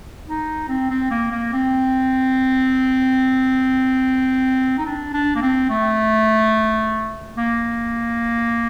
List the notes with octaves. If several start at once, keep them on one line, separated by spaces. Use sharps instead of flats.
D#4
C4
C4
A#3
A#3
C4
D#4
D4
D4
A#3
C4
A3
A#3